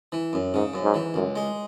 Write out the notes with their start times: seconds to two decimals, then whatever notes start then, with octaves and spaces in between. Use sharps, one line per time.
0.12 E3
0.33 F#2
0.54 G#2 C#3
0.73 F#2
0.84 G#2
0.94 E3
1.14 C#2 F#2
1.36 G#3